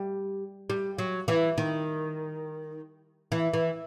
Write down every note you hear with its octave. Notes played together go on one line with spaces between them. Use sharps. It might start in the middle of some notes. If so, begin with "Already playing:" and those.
Already playing: G3
G3
F#3
E3
D#3
E3
E3